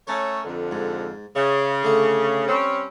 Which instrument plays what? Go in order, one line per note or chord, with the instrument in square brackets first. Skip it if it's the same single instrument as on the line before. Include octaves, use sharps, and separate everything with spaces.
[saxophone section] A3 C#4 C#5 [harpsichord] A#4
[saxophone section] F2 D3
[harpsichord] G#2
[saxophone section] C#3 [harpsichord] E5
[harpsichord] D3 A3 F#5
[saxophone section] G3 C4 C#4